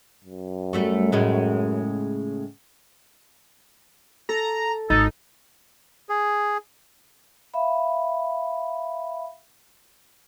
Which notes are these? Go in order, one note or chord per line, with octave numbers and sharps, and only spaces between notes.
F#2
G3 A3 F#4
A2 C#3 G#3
A4 A#5
G#1 D#4 A4
G#4
E5 F5 B5